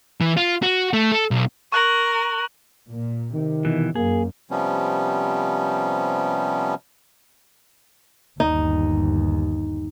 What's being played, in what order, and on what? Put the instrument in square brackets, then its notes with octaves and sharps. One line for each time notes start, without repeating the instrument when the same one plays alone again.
[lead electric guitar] E3
F4
F#4
A3
A4
B1
[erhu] A#4 [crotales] C#6 F#6 F#7
[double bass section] A#2
[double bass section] C3 [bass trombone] D#3
[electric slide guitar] B2 E3
[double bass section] F#2 [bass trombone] A#3 [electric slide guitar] G#4
[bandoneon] C3 F3 G3 B3 C#4
[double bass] G1 D#2 [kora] D#4